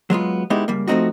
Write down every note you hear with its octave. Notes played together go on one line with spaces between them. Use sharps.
F#3 G#3 B3 F4
G#3 B3 D#4 E4 G4
C#2 G3 A#3
F3 A3 A#3 C4 D#4 F#4